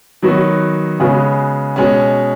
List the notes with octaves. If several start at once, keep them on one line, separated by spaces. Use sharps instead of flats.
D#3 F#3 B3 F#4
C#3 G#3 B3 F#4
B2 G#3 C#4